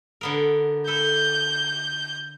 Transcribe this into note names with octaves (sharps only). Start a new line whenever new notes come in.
D3 B3 A#4
A4 B4 G6